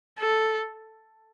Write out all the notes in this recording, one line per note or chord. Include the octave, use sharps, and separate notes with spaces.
A4